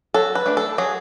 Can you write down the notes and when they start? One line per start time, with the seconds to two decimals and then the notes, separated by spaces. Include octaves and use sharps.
0.14 F#3 A4
0.35 B4
0.46 A3 D4
0.57 A4
0.78 F#3 G#4